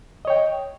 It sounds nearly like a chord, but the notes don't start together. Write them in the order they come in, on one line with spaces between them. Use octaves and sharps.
D#5 C#5 G5